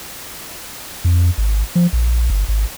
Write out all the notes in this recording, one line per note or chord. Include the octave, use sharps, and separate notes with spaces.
F2
G#1
F3
A#1
G1
G#1